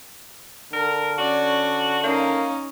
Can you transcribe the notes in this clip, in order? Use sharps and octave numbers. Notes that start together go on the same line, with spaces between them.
D3 A#4
C#4 F#4 D5
A#3 C#4 D#4